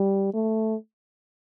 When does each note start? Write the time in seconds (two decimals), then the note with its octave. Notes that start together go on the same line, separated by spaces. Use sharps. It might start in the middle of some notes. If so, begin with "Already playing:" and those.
Already playing: G3
0.34 A3